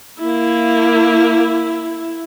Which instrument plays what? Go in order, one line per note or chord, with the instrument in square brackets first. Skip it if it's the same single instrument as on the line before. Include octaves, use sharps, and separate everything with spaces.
[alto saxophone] A#3 [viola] E4